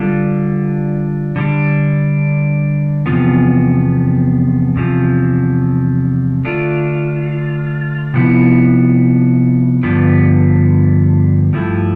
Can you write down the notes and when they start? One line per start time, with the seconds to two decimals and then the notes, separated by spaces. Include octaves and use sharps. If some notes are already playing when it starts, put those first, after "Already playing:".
Already playing: D3 G3 D4 F4
1.36 D3 G3 D4
3.06 E2 C3 F3 B3
4.76 E2 C3 F3
6.45 D3 A3 D4 F4
8.14 C3 F3 B3 E4
9.83 G2 D3 F3 B3
11.53 G2 F3 A3 E4